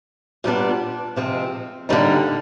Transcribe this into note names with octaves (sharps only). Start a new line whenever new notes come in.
A#2 G3 B3 D4
C3 F3 G#3 C4
D3 G3 A#3 D#4